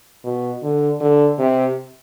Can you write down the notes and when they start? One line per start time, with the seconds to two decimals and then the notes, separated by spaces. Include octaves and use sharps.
0.24 B2
0.63 D3
1.01 D3
1.39 C3